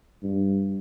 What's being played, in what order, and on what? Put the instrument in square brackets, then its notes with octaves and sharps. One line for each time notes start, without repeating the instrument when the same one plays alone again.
[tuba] G2